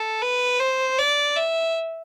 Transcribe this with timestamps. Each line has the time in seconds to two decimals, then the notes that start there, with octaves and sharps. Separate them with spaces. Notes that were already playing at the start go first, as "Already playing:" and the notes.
Already playing: A4
0.22 B4
0.60 C5
0.99 D5
1.36 E5